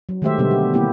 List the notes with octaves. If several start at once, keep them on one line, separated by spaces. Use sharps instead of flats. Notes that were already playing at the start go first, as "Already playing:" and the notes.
F#3
D#3 G#3 A3 G4 C5 E5
B2 D3 G3 B3
G4
A#3 C4 E4 G4